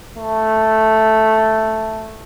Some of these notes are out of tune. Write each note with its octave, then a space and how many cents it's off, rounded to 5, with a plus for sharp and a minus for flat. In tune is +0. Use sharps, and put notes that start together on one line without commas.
A3 +0